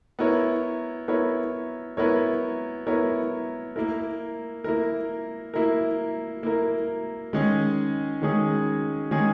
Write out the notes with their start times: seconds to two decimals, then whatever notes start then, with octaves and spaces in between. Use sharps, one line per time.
0.19 B3 E4 A#4 C#5
1.08 B3 E4 A#4 C#5
1.97 B3 E4 A#4 C#5
2.87 B3 E4 A#4 C#5
3.76 A#3 E4 A#4
4.64 A#3 E4 A#4
5.54 A#3 E4 A#4
6.43 A#3 E4 A#4
7.33 D#3 G#3 C#4 G#4
8.22 D#3 G#3 C#4 G#4
9.11 D#3 G#3 C#4 G#4